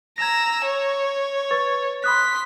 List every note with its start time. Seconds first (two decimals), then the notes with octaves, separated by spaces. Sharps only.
0.18 A#5 E6 G#6 A#6
0.65 C#5
1.51 B4 C#6 A6
2.04 B5 C6 D#6 F#6 B6